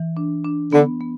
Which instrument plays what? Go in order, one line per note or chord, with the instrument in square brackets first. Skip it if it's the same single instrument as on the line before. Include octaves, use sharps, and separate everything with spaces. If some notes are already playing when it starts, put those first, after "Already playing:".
Already playing: [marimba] E3
D4
D4
[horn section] D3 [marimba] B3
[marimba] B3